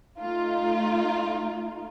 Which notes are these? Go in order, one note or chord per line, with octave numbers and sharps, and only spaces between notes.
A3 D#4 F4